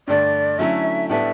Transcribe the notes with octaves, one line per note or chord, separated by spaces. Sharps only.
G2 D3 A3 D5
D3 F#3 A3 C#4 E4 E5
A2 G3 B3 D4 A4 E5